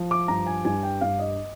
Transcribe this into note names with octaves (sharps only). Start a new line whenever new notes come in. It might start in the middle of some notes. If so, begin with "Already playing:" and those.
Already playing: F3
D6
G2 A#5
G#5
G2 G#5
G5
G2 F5
D#5